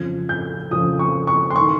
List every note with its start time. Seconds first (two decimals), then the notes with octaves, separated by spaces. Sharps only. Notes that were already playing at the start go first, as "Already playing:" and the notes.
Already playing: F2 C#3 F3 G#6
0.29 G6
0.71 F2 C#3 F3 D#6
0.99 C#6
1.27 C#6
1.51 C6
1.56 D#3 C#6